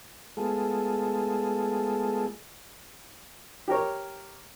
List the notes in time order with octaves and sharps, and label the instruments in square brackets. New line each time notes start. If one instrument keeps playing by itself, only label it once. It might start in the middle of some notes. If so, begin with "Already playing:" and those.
[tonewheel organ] G#3 A3 B3 F4 G#4 A4
[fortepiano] G4 A#4 C#5